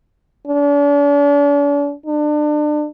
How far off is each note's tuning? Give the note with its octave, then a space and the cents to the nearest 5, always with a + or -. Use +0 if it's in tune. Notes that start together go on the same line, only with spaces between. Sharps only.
D4 -40
D4 +30